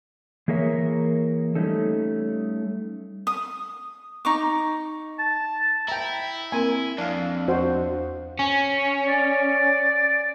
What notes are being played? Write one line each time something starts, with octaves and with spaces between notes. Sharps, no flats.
E3 A#3 G#4 A#4 C#5 E5
G3 A3 C#4 D#4 A4
D#6
D#4 C#6 D6
A5
E4 G5 A#5
A#3 C4 A#4 G#5
F2 D4 F5
E2 F#4 C5 D#5
C#4
D5